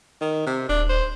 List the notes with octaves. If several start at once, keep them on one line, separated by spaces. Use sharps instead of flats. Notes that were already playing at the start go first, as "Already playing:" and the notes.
D#3
C3
D#1 D4
C5